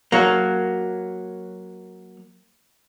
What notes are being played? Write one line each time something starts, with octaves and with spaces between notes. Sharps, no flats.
F#3 A#3